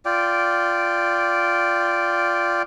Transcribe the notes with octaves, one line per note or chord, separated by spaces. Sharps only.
F4 D5 G5